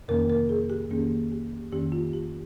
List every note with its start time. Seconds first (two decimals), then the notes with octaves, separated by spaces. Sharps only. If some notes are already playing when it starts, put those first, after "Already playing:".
0.08 F2 C3 D#3 A#3 C#4 A#4
0.30 A#4
0.49 G#4
0.70 G4
0.91 F2 D#3 A#3 C#4 G#4
1.32 G4
1.72 F2 D#3 A#3 C#4 G4
1.92 F4
2.13 G4